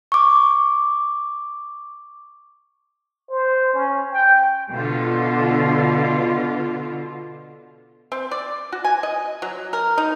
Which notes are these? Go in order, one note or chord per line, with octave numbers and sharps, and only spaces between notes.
C#6 D6
C5
C#4
G5
B2 D3 F4
C4
D5
F#4
G#5
D#5
F#3
A#4
D#4